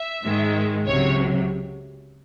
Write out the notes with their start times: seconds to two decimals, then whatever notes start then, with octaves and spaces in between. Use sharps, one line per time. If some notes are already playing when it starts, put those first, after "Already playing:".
Already playing: E5
0.24 G#2 D#3 G#3
0.87 C#2 C3 F#3 C#5